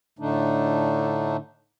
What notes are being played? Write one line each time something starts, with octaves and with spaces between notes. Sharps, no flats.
A2 D3 A3 D4 D#4